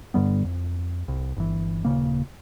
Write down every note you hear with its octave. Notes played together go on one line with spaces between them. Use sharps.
G2 D3 G3 B3
F2
C2
G1 E3
D#1 C#2 C#3 A#3